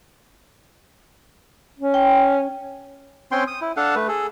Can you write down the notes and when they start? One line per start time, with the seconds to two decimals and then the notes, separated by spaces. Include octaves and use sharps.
1.78 C#4
1.94 G5
3.32 C4 C#4 G5 C6
3.47 D#6
3.62 E4
3.77 D4 A4 F5 F#5
3.95 A3 B4
4.08 G#4 A4